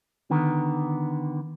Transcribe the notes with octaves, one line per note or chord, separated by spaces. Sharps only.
D3 D#3 B3